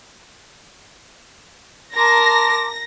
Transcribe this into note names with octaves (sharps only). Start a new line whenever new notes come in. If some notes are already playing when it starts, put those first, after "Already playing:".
A#4 A5 A#5 C6 D6 A#6